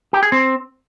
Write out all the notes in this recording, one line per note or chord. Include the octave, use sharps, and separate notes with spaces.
G4
G#4
C4